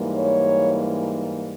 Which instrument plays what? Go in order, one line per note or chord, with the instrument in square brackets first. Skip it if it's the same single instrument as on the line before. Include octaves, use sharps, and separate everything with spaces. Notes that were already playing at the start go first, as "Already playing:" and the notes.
Already playing: [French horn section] G#2 E3 G3 A#3
C#5